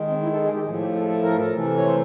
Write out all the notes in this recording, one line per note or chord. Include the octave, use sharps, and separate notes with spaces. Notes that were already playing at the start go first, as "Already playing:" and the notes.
Already playing: D#3 G#3
C4
E4
A4
G#4
G4
A2 F3 A3 G#4
G4
A4
A4
A#4
A4
C3 E3 A3
C#5
C5